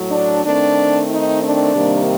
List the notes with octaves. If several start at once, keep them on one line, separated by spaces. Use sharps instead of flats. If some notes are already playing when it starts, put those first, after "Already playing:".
Already playing: A2 F#3
D4
D#3 A3 C4 D4
D#4
D4
C3 D#3 G3 A#3